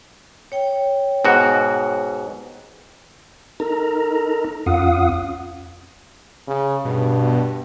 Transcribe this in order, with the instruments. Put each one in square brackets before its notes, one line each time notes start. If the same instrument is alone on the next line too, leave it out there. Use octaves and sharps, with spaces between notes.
[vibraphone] C#5 G5
[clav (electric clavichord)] G#2 B2 F#4
[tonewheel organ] D#4 A4 A#4 A#5
F2 C#4 F4 F5 F#5 D#6
[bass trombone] C#3
[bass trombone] G2 [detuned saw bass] B2